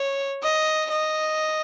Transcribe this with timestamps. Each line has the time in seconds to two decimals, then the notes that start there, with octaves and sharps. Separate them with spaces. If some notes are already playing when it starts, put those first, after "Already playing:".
Already playing: C#5
0.43 D#5
0.91 D#5